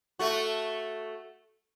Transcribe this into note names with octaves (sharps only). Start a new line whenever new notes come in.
A3 F#4